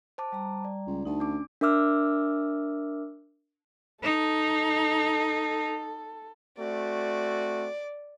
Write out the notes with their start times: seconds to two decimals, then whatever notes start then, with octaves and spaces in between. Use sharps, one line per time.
0.18 C5 A5 D6
0.32 G3 A#5
0.65 D5
0.87 C#2
1.05 D2 D#4 A5
1.20 C#4 D4 D6
1.61 D4 A#4 E5 D6 E6 F6
4.03 D#4 A4
6.58 A3 C4 F#4 D5